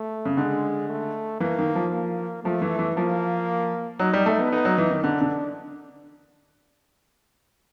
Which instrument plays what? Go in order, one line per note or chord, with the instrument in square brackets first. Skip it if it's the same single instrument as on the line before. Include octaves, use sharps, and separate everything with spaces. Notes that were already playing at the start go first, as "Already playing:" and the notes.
Already playing: [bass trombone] A3
[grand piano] C#3
[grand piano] D3 [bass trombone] G#3
[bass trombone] A3
[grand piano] E3 [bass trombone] A#3
[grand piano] D#3
F3
[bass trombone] A#3
[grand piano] F3 [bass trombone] A3
[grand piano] E3
E3
[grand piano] F3 [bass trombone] A#3
[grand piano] F#3 [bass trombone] D#4
[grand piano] G3
A3
B3
[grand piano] B3 [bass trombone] D#4
[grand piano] F#3
E3
D#3
[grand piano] D3 [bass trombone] D4
[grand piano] D3